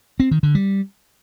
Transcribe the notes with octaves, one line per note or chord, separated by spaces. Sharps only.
C4
D#3
D3
G3